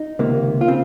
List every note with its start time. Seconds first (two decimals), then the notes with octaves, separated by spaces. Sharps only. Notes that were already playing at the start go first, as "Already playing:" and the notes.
Already playing: D#4
0.19 C#2 C3 D#3 A#3
0.61 F4
0.68 C#3 C4